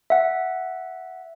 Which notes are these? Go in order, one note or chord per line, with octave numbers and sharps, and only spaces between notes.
E5 F#5